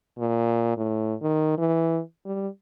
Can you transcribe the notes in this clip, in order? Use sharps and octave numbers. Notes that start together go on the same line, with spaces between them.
A#2
A2
D#3
E3
G3